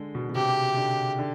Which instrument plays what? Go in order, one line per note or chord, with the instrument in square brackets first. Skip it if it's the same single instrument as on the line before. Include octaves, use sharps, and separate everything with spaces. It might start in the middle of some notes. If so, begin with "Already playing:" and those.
Already playing: [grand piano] D3 G#3
B2
B2
[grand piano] C3 [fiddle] G4
[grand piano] C3
D3
D3